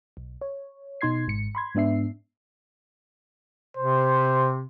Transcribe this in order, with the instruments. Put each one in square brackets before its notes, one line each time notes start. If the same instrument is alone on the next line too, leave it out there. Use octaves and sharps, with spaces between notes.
[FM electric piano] B1
C#5
B2 D#4 C6 G#6 C7
G#1 G#2 C#7
B5 C6 G#6
G#2 B3 D4 E5 C7
[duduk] C3 [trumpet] C5